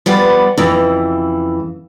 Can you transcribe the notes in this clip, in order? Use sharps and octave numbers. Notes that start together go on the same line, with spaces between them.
F3 G3 B3
F2 C#3 E3